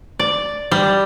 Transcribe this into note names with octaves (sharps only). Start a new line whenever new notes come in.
D5
G3